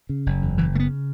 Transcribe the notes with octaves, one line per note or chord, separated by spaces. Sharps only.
C#3
F#1
E2
F#1 E3
C#3 A3 B3